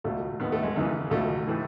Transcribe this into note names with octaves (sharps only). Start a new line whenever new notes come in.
C#2 B2 A3
D#2 D#3 B3
A3
G#3
E2 C#3 E3
C#2 B2 A3
A2 E3